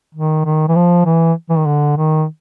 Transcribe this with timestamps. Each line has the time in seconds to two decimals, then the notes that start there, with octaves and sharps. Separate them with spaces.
0.15 D#3
0.45 D#3
0.68 E3
0.75 F3
1.05 E3
1.49 E3
1.58 D#3
1.66 D3
1.97 D#3